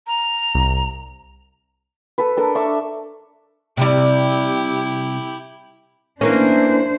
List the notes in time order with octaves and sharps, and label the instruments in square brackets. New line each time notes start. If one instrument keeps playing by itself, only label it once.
[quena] A#5
[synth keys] C2
[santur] A4 B4
D4 A4 A#4
D4 A4 E5 C#6
[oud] C3 G3 [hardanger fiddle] E4 G4
[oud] E3 A#3 C#4 [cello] D4 C5